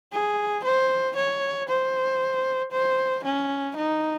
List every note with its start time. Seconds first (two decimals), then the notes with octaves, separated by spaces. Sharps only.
0.13 G#4
0.64 C5
1.16 C#5
1.69 C5
2.72 C5
3.25 C#4
3.76 D#4